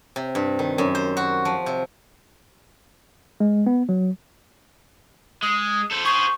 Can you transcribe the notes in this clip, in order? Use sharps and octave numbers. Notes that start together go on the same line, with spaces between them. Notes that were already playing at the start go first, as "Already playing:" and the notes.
C3
G2
D#3
F#2
C5
F#4
F3
C3
G#3
B3
F#3
G#3 D#6
A4 C5
G#4 C5 C#6